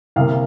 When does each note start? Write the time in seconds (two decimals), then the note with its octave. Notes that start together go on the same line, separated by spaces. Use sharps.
0.16 C2 C3 A#3 F5